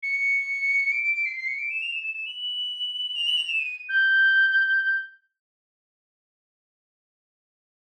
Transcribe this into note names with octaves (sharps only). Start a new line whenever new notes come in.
C#7
D7
D7
D7
C7
C7
C#7
D7
E7
F7
E7
E7
E7
F#7
F7
F#7
F7
E7
D#7
G6